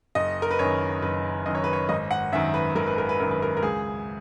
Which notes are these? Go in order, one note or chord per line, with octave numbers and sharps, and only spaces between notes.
F#1 D#5
A#4
B4
F#2 D#3 C#5
F#1 B4
F#2 D#3 D#5
C#5
B4
C#5
G#1 D#5
F#5
F#2 D#3 E5
B4
G#1 A#4
B4
A#4
B4
F#2 D#3 A#4
B4
A#4
A#4
C#2 G#4